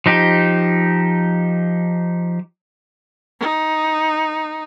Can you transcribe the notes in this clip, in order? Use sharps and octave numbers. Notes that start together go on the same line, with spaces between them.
F3 D#4 G4
D#4